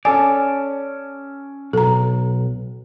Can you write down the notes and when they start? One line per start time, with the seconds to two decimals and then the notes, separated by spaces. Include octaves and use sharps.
0.05 C#4 A4 D5 G#5
1.73 B1 A4 A#5